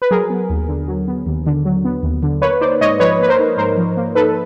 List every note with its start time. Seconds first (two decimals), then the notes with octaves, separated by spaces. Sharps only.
0.02 B4
0.11 F#3 G#4 A#4
0.30 B3
0.50 D#2
0.68 D3
0.88 F#3
1.08 B3
1.26 D#2
1.46 D3
1.65 F#3
1.85 B3
2.03 D#2
2.23 D3
2.42 A#3 B4 C#5
2.61 D#4 C5 D5
2.81 G#2 C#5 D#5
3.00 F3 B4 C#5
3.19 A#3 B4
3.29 A#4 C5
3.39 D#4
3.57 G#2 A#4 C5
3.77 F3
3.97 A#3
4.15 D#4 A4 B4